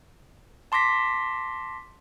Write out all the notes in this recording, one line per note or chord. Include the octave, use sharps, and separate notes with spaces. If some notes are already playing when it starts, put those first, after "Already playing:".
A5 C6 D6 A#6 B6